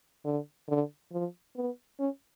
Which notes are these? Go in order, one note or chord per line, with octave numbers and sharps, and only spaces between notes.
D3
D3
F3
B3
C#4